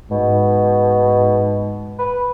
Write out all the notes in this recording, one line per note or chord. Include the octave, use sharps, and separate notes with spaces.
G#2 B2
B4